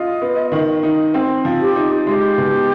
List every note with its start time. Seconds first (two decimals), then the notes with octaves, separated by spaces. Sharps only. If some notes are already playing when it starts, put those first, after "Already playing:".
Already playing: F4 D#5
0.22 B3
0.52 D#3
0.83 D#4
1.14 C4
1.45 F3
1.60 G4
1.76 D#4
2.07 G#3 G4
2.38 B2